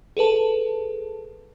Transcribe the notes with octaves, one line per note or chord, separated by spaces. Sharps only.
G#4 A4 B4 A5